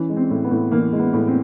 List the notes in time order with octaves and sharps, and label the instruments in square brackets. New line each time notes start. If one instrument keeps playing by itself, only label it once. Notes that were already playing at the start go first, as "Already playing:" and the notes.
Already playing: [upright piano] E3 C#4
G#3
C4
A2
B3
A2
E3 A#3
G#3
B3
A2
C4